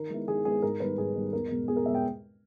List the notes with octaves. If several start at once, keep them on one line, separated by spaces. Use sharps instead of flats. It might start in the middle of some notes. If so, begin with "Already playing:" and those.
Already playing: D#3 A#4
G#3 B3 E4
D#3 G#4
G#3 B3 E4 G#4
G#2 A#4
D#3 G3 B3 B4
G#2 G#4
D#3 G3 B3
E2 A#4
B2 G#3
E2 G#4
A#4
B2 G#3 E5
G5